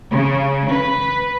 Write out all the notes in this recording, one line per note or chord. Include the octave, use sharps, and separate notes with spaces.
C#3
B4